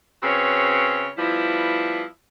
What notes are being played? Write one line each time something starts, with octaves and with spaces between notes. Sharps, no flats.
C#3 C4 F#4 B4 C#5
F3 G3 B3 E4